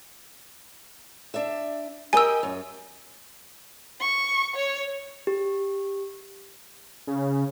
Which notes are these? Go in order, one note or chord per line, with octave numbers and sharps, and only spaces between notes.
D4 E5
G4 A#4 D#5 G#5 E6
F#2
C#6
C#5
G4
C#3